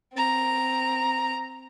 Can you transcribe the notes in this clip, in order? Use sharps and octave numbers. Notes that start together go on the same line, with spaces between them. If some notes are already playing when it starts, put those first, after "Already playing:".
C4 A#5